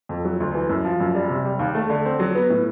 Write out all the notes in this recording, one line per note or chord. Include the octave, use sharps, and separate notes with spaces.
F2
F#3
D2
E3
F#2
F3
F#2
G3
C3
G3
D#2
A3
D3
C4
F#3
B3
A2